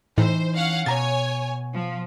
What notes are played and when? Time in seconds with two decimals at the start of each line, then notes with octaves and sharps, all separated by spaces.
0.18 A2 E3 D#4 C5
0.55 C#4 F5 F#5
0.86 B2 C#5 G#5 A#5 A6
1.73 F3